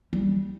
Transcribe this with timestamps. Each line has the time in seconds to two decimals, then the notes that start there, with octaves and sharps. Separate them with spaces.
0.13 G3